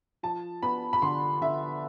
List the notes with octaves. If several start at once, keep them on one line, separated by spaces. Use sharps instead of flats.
F3 A5
B3 B5
B5
D3 C6
D3 E5